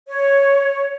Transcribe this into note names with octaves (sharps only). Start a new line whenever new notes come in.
C#5